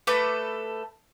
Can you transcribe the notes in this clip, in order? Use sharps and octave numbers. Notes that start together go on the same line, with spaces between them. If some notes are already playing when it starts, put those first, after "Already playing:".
A3 A4 B4 D6